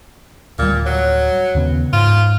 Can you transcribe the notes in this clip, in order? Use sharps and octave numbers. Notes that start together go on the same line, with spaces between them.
D1 A#2 G3
F#3
D#2 C#3 B3
G#2 F4